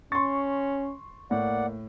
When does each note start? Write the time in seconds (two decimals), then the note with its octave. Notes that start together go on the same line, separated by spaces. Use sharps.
0.12 C#4 C6 C#6 A6
1.31 A2 A#3 D5 F#5